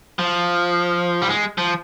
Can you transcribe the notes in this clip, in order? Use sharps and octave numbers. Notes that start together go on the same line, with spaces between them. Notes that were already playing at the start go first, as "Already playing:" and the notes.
F3
G3
G#3
F3